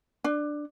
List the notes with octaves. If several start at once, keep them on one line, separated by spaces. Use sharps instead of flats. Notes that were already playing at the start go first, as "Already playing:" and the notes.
D4